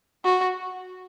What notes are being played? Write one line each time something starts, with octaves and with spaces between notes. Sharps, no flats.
F#4